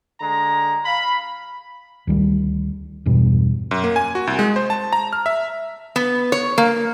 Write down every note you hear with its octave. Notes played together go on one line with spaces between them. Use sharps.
D3 G#3 A#5
F5 B5
D2 D#3 G3
E1 E2 G2 B2
F#2
A#3
G#5
F#4
C2
G#3
C5
A5
A#5
F6
E5
B3
C#5
A#3